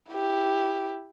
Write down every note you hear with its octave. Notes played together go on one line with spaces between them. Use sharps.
E4 G4